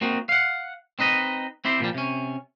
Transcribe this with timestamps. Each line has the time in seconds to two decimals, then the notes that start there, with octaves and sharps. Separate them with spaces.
0.01 A#3 C4 D#4 F#4
0.29 F5 F#5
0.99 C4 D#4 B4 D#5
1.65 C4 E4 G4 C5
1.80 A#2 F3 G3
1.94 C3 C#4